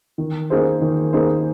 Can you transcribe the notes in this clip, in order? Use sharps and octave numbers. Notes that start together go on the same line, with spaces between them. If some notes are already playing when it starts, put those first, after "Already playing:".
D#3
A#3 D#4 G#4 C5
D#3
A#3 D#4 G#4 C5